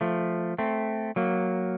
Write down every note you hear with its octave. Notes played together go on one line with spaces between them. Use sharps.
F3 A3
A3 C4
F#3 A#3